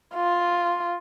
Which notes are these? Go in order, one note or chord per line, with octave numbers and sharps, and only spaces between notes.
F4